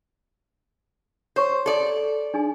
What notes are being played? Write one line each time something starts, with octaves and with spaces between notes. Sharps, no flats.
C5 C#5 C#6
A4 D5
D4 D#4 G#4